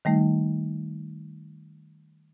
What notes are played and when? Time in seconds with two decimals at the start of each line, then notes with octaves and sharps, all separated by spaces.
0.05 D#3 G3 A3 D#4